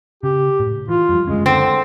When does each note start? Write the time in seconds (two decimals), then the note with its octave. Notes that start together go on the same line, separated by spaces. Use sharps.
0.23 C#3 G4
0.60 A2
0.88 E3 F4
1.09 F2 G3
1.27 F#1 D2 G#3 C#4
1.46 D3 C4